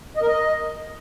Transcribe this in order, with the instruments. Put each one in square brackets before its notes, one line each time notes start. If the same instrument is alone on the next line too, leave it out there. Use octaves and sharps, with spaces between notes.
[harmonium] D#5
A#4
D#5